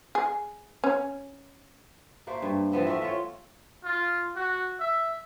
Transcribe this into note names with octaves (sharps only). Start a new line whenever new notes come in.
G#4
C#4
A3 A#3 C5
G2
E3 F3 B3 C4
A3 B3 C4 E5
F4 C#5
F4
F#4
E5